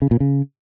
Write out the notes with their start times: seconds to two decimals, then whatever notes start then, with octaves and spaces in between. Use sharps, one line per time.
0.02 C#3
0.11 A#2
0.20 C#3